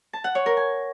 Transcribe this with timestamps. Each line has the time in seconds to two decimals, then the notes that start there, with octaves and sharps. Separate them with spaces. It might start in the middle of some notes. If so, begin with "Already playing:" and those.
0.13 A5
0.24 F#5
0.35 C#5
0.46 A#4
0.57 G#5